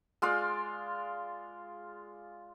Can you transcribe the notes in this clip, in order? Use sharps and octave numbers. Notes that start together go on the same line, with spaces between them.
G#3 F4 D5 F5